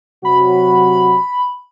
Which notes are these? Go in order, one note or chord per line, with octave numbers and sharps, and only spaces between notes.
C3 F#3 F#4 B5